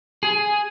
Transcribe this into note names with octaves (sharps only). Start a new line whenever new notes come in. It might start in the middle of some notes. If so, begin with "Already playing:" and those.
G#4